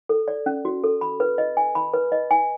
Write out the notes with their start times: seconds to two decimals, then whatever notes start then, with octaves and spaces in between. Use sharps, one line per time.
0.09 A4
0.28 D5
0.46 C#4
0.65 F#4
0.84 A4
1.01 B5
1.20 B4
1.38 D#5
1.57 G#5
1.75 B5
1.94 B4
2.12 D#5
2.31 G#5